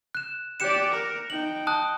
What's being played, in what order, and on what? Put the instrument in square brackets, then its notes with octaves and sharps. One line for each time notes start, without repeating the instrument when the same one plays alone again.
[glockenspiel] F#6 E7
[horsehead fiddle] G4 D5 [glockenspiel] F#6 C#7 E7
[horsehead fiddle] A#4
[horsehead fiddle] D#4 G5 [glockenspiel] F#7
[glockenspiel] A5 D#6 F#6